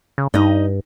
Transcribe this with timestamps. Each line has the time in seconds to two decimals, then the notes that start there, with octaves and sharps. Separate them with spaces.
0.18 C#3
0.34 G2 D#4 D#5